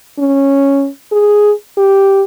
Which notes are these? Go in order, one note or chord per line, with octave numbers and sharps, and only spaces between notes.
C#4
G#4
G4